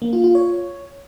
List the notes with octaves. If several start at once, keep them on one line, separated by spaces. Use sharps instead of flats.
A#3
F4
F4
C#5